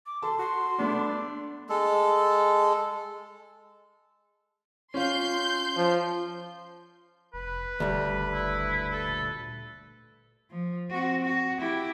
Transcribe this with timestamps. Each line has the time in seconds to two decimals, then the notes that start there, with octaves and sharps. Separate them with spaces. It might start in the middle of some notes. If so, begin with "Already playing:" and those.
0.06 D6
0.22 A4 A5 C6
0.39 F#4 C6
0.79 A3 B3 D4
1.70 G#3 A4
4.94 C#4 F4 C6 G6
5.77 F3
7.34 F1 B4
7.80 F#1 D2 G3
8.34 E4
8.90 A4
9.08 A#2
10.50 F3
10.91 C4 F#4
11.24 F#4
11.59 E4 G4